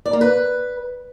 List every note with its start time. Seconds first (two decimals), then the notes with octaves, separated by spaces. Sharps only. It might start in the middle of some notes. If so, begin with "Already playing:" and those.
0.06 D5
0.13 A#3
0.21 B4